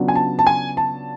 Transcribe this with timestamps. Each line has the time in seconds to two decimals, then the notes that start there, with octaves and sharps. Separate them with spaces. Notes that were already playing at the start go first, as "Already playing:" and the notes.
Already playing: C#3 F#3 B3 D4 F4
0.08 G#5
0.16 A5
0.39 A5
0.47 G#5
0.77 A5